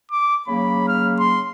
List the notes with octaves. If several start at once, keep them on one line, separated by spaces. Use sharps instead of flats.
D6
C#3 F#3 A#3 B5
F6
C6